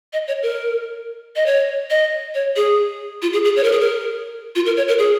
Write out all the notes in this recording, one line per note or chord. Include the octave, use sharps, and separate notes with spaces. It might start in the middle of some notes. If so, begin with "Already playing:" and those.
D#5
C#5
A#4
D#5
C#5
D#5
C#5
G#4
F4
G#4
G#4
C#5
A#4
G#4
A#4
F4
A#4
C#5
A#4
G#4